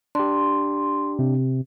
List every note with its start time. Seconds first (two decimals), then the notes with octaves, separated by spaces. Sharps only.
0.15 D4 G4 C6
1.19 C3